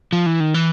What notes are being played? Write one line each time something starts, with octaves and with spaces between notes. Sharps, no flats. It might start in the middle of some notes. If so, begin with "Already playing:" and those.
F3
E3
D#3
E3